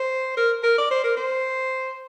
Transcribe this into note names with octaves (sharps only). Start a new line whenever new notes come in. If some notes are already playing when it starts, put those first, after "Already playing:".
Already playing: C5
A#4
A#4
D5
C5
A#4
C5